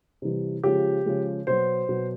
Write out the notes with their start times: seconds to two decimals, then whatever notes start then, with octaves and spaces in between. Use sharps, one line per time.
0.22 C3 E3 G3
0.63 C#3 F3 G#3 G4
1.06 C#3 F3 G#3
1.47 B2 F#3 C5
1.89 B2 F#3